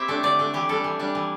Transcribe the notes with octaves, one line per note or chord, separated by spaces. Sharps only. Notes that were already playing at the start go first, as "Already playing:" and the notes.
Already playing: C4 E4 G4 E5
A3 D4
D3 D5
A3 D4
E3 G4
G3 D4 A4
E3
G3 D4
E3